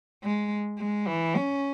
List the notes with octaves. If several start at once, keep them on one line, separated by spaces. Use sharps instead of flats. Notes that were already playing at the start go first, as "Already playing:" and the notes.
G#3
G#3
E3
C#4